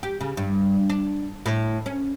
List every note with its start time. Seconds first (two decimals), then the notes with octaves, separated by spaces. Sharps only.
0.03 G4
0.21 C#3
0.37 G2
0.90 D4
1.46 A2
1.86 C#4